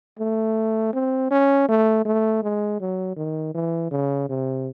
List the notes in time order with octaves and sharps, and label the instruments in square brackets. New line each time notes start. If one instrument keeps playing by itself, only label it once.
[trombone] A3
C4
C#4
A3
A3
G#3
F#3
D#3
E3
C#3
C3